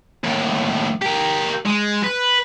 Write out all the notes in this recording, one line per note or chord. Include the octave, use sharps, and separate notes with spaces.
D#2 A2
G4 A#4
G#3
B4